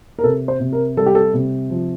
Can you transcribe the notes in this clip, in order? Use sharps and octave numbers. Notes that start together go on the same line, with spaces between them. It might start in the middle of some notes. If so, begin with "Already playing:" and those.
A#4
C3 A4
C5
C3
A#4
G3 A4
G4
A4
C3
F3